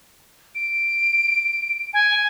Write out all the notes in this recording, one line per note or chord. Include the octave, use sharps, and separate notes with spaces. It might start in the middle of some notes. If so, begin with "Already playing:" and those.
D7
G#5